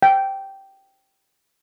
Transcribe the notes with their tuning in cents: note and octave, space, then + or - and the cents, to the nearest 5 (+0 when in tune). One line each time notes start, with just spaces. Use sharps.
G5 -10